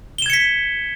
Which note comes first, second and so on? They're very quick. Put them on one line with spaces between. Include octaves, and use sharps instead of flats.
G7 E7 G#6 C#7 B6